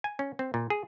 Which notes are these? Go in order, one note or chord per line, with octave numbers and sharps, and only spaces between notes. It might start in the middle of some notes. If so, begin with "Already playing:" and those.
G#5
C#4
C4
A#2
G#4